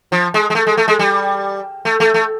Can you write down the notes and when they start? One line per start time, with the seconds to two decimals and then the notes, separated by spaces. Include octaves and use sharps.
0.12 F3
0.34 G#3
0.50 G#3
0.55 A3
0.67 G#3
0.77 A3
0.88 G#3
0.99 G3
1.85 A3
2.00 A3
2.14 A3